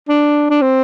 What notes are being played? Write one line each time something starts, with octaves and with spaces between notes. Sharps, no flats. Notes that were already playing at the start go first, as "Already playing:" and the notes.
D4
D4
C4